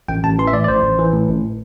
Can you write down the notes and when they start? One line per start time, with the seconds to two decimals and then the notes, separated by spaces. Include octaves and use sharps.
0.08 A1 G5
0.23 A1 A5
0.38 E3 C6
0.47 E5
0.53 A2 D5
0.64 D5
0.68 A1 C5
0.84 A1
0.98 E3
1.13 A2
1.28 A1